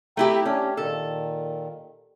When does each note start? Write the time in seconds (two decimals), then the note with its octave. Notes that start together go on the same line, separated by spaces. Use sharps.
0.17 A3 E4 G4 G5 A#5 E6
0.46 A3 C#4 D4 G4
0.77 A#2 D#3 A4